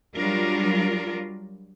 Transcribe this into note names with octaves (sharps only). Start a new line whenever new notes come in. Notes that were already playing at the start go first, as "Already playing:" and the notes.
F#3 G3 D4 F4 A#4